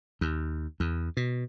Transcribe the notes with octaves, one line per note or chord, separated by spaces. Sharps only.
D#2
E2
B2